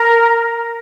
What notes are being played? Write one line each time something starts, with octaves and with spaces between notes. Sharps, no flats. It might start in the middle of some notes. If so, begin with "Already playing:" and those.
Already playing: A#4